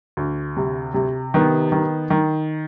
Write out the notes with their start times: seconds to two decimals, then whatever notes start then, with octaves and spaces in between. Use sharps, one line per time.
0.17 D2
0.57 C3
0.94 C3
1.34 D#3 B3
1.72 D#3
2.10 D#3